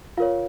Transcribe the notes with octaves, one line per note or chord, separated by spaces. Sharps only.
F4 A#4 C#5 F5